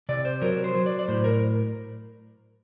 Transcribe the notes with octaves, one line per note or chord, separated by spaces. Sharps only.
C3 D5
C5
F#3 A#4
C5
F#3
D5
D5
A2 C5
A#4